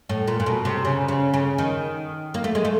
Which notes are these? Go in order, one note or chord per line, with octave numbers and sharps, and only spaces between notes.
A2
A#2
A#2
B2
C3
C#3
C#3
C#3
D#3
A#3
A3
G#3
A3